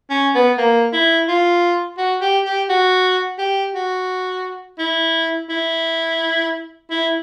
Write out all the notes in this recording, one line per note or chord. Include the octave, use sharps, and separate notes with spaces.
C#4
B3
A#3
E4
F4
F#4
G4
G4
F#4
G4
F#4
E4
E4
E4